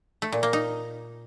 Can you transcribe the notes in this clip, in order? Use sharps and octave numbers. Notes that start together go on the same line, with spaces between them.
A3
A#2
A#3
D#4